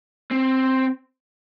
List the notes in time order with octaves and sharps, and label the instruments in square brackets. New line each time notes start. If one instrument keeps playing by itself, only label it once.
[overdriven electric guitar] C4